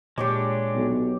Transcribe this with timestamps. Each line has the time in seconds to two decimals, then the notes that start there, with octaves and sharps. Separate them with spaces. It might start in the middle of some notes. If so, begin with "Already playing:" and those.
0.18 A#2 G#3 D4 G4 C#5 D5
0.75 B1